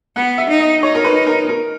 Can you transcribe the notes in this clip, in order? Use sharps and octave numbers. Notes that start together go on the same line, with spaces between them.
B3 F#5
E5
D#4
D#5
D#4 C#5
A#4
B4
A#4
A#4